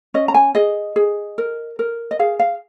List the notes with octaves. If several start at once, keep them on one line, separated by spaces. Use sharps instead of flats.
C#4 D#5
A#5
G#5
G#4 D#5
G#4
A#4
A#4
D#5
G#4 F5
F5